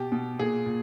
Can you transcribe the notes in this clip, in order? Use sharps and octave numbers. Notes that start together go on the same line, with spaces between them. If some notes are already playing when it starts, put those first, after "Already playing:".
Already playing: B2 G4
B2
A#2 G#4
A#2